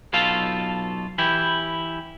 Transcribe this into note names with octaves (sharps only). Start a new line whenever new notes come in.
B1 B2 F4 A4 F5
E3 E4 G4